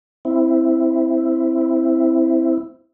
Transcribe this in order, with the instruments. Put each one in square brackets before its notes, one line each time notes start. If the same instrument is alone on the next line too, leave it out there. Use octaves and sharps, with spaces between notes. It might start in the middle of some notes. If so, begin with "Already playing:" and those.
[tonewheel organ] C4 E4